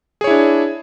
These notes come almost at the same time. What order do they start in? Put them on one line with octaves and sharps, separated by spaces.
G#4 C#5 E4 D4